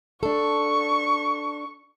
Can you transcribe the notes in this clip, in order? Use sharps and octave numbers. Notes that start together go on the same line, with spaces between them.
D4 A4 C#6